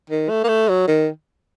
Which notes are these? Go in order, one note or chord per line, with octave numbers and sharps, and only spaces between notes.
D#3
A3
A#3
A3
F#3
D#3